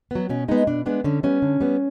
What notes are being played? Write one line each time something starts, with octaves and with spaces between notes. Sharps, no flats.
F#3 B3
B2 C#4
G#3 B3 D#4
B2 D4
G#3 B3 D4
D3 C#4
G3 B3 C#4
D3
G3 B3